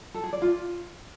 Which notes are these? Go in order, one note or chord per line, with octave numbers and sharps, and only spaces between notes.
A4
G#4
D5
F4